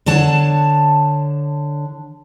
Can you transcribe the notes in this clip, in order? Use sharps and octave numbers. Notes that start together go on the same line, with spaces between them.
D3 D4 C#5 A5